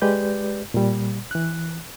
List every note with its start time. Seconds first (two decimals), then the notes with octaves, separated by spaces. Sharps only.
0.02 G#3 G4 B4 D5 G6
0.74 A#2 G3
1.31 E3 F#6